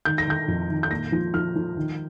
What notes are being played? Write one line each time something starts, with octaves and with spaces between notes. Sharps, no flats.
D#3 G6
A#6
D#3 G6
F2
D#3
G6
A#2 A#6
F3
F3 F6
F3
D#3